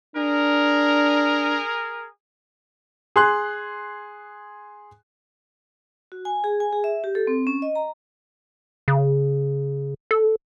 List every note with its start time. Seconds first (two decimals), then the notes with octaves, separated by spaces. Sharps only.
0.16 D4 G#4 A#4
3.16 G#4 C6 F#6
6.12 F#4
6.25 G#5
6.44 G#4
6.60 G#5
6.73 G#4
6.84 E5
7.04 G4
7.15 A4
7.27 C4
7.47 C#4
7.62 D#5
7.76 A#5
8.88 C#3
10.11 A4